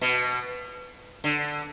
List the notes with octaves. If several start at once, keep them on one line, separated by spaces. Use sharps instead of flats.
B2
D3